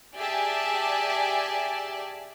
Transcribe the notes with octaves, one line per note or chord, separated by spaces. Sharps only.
G4 G#4 D5 E5 G#5 A5